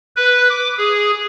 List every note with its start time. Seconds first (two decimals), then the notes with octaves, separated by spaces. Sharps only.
0.16 B4
0.50 D6
0.78 G#4